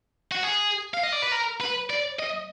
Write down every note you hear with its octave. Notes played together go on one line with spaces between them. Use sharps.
F#4
G#4
F5
D#5
D5
B4
A#4
B4
D5
D#5